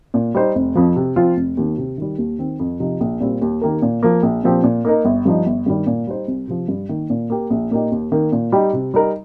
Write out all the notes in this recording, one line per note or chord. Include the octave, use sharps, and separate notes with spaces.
A#2
G3 D#4 C5
F1
F2 F3
C3
F3 C4 F4
F1
D#2 D#3
C3
D#3 G3
D#2
D#3 C4
F2
C3 F3 D#4
A#1
A#2 G3 C4 G4
D#2
D#3 A#3 G4 A#4
A#2
F3 A#3
A#1
A#2 F3 C4 G4
A#2
A#3 D#4 A#4
G1
G2 F3 D#4
G1
G2 D#3 G3
A#2
G3 D#4 C5
C2
C3 F3
G2
D#3 A#3
A#2
A#3 G4
A#1
A#2 A#3 D#4 G4
D#2
D#3 A#3
A#2
G3 D#4 G4
C3
G3 D#4 A#4